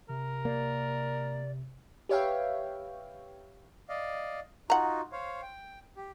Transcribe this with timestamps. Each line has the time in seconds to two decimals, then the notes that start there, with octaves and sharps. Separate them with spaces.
0.09 C3 A#4
0.45 A#3 D5
2.09 G4 B4 C#5 E5 F5 G5
3.89 D5 D#5 F5
4.70 D#4 F4 F#4 F#5 A#5
5.12 C5 C#5 F5
5.42 G5
5.96 G4